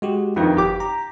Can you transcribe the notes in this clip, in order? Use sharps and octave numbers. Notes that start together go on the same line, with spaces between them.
G#3 F#4 G4
F2 D#3 D4 E4 B4
G1 G4 D6
A#5